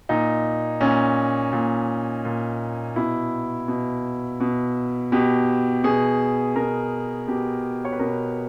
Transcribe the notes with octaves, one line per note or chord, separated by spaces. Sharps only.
A#2 D#4
A#2 C#4
A#2
A#2
B2 E4
B2
B2
B2 G4
B2 G#4
B2 A#4
B2 G4
C#5
B4
B2 A#4